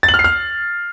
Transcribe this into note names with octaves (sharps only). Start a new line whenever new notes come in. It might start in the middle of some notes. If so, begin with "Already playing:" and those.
A6
F#7
F6
C7
F6